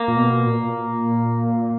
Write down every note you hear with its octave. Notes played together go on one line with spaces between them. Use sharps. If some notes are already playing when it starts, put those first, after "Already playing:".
Already playing: A#3
A#2
B2
A#2